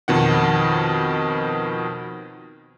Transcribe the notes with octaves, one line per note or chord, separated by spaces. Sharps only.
F2 B2 D#3 F#5